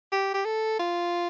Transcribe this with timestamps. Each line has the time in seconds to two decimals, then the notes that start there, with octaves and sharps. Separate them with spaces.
0.12 G4
0.34 G4
0.45 A4
0.79 F4